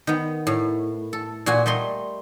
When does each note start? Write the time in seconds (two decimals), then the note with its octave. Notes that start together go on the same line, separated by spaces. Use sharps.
0.07 D#3 B3
0.47 A2
1.13 A4
1.46 A#2 F#4 G#5
1.66 G3 A3 D#5 C6